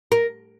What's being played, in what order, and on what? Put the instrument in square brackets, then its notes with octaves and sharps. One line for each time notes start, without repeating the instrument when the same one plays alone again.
[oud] A#4